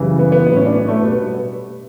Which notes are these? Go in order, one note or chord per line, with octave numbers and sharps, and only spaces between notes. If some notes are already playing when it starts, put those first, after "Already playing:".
Already playing: F#2 C#3 E3 G3
B3
B3
A2 F#3 B3
C#4
D4
B3
A3
B2 G3 B3
B3